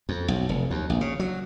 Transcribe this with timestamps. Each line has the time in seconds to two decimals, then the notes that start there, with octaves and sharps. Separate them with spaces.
0.09 F2
0.28 B1
0.49 F1
0.70 D#2
0.90 A#1
1.01 C#3
1.20 F#3